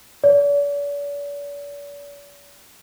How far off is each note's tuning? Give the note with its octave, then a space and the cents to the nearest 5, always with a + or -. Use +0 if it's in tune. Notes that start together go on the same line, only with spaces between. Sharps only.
D5 -45